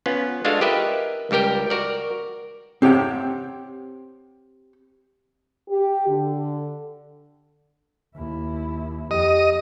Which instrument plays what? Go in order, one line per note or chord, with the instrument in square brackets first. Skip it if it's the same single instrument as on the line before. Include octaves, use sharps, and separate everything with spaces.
[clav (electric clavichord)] B3 C#4 F4
G#3 D4 F4 F#4 A4 F5
G4 A#4 B4 D#5 E5
C#2 G3 G4 A#4 G5
F#4 A#4 D5
[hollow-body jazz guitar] C4 G4 C#5 F#5 G5
[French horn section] G4
D3
[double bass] D#2 E4
[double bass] F2 [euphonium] G4 [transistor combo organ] D#5